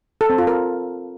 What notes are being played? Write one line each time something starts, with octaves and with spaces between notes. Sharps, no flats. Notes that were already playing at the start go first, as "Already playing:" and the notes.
A4
C4
F4
A#4